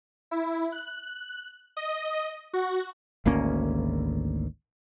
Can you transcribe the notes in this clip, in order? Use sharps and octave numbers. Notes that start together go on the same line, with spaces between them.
E4
F#6
D#5
F#4
G#1 D2 A#3 C#4